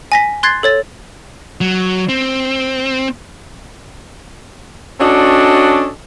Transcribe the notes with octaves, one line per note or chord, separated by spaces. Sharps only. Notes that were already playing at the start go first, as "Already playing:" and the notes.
G#5 A#6 B6
C6 F#6 G#6 A6 C7
A4 C#5 A6
F#3
C4
C#4 D4 F#4 A4 D5 D#5